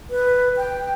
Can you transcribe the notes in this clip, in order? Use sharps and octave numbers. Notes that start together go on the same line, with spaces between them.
B4
G5